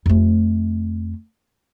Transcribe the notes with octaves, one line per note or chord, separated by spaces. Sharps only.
F2 A3